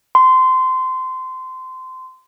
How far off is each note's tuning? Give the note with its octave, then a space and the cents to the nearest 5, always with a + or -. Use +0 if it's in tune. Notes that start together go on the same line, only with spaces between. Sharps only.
C6 -20